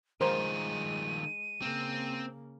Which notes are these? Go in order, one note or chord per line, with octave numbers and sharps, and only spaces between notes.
D#3 F3 G#3 A#4 C5 D#7
C#3 A#3 C4